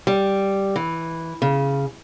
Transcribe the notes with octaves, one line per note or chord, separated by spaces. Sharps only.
G3
E3
C#3